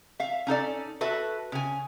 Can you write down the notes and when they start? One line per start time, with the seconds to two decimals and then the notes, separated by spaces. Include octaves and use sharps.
0.20 E5 F5
0.47 C#4 D#4 A4 D5
1.01 F#4 A4 B4 E5
1.52 C#3 G#5